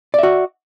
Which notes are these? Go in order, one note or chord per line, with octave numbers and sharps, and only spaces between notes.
F#4 D5 E5